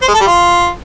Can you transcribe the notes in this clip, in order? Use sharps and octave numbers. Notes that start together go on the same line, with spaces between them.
C5
G#3
A4
G3
F4